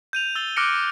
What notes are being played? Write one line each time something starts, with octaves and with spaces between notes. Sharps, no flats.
G6 D#7 F7
E6 A6 G7
D6 F6 F#6 A#6 C#7 D7